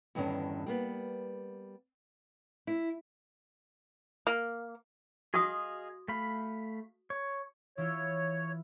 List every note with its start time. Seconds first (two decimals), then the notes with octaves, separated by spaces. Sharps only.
0.15 E2 G2 D3 D#3 C#4
0.66 G3 A#3 B3
2.67 E4
4.27 A#3
5.34 F#4 G#4 D#5 F5 D#6
6.08 A3 F5 B5
7.10 C#5
7.78 E3 E4 F4 C#5